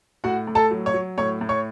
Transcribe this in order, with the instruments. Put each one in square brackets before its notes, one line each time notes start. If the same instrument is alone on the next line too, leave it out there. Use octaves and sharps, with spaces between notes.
[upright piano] A2 F#4 F#5
A2
A4 A5
F#3
C#5 C#6
F#3
A2 C#5 C#6
A2
C#5 C#6